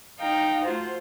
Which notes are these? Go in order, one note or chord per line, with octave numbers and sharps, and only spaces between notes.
D#4 F5 G5 A#5
A3 F4 F#4 C5